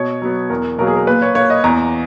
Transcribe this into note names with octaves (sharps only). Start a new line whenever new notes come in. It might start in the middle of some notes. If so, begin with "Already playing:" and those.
Already playing: B2 C#5
F#3 B3
E2 A#4
B2 F#3 A#3 A#4
G#4
A#4
A#2 B4
C#5
A#3 C#5
D#5
E2 A#5